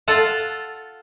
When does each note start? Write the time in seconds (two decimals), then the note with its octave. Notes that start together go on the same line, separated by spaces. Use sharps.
0.08 F4 A4 F#5